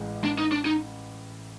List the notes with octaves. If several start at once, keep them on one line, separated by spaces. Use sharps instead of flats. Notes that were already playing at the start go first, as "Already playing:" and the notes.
Already playing: A1 A2 G#3
D4
D#4
D4
D#4